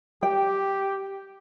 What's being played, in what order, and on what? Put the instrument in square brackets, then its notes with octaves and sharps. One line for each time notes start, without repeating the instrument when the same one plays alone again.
[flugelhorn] G4 [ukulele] G5